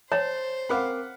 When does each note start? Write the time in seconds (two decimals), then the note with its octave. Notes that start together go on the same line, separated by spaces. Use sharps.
0.12 C5 C#5 A5
0.69 C4 A#4 F5 F#5 B5 D6